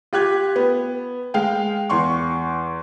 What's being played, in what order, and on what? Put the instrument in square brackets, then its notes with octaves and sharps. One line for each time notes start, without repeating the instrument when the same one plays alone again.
[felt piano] F4 G4 F#6 G#6
B3
G#3 F5 G5
E2 C6 C#6